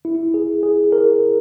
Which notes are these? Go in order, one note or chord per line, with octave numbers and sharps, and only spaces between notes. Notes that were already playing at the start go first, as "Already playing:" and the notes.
E4
G#4
G#4
A#4